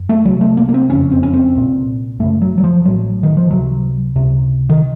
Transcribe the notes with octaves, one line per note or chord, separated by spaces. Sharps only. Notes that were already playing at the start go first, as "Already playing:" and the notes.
Already playing: F#2
A3
C2 C3 F#3
A3
A#3
A#3
C4
F#1 F2 C#3 C#4
C4
C#4
C4
C2 A#2
F#1 F#2 C#3 A3
F#3
F#3
F3
A1 A2 F#3
D#3
F3
C#2 C3 F#3
C#2 C3
D#3